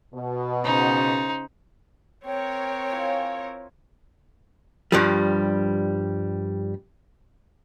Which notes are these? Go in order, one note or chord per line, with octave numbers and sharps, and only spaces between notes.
B2
C#3 D#4 C5
C4 A#4 C#5 G5
E4 F4 G#5
G2 F3 G3